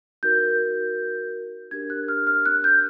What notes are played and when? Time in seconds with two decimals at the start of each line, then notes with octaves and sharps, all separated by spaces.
0.23 D#4 F#4 A#4 G6
1.71 D4 G4 A#4 G#6
1.90 F#6
2.08 F6
2.27 F6
2.46 F#6
2.64 G6